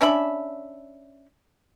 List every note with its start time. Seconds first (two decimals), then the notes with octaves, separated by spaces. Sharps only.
0.01 C#4 D4 E5 B5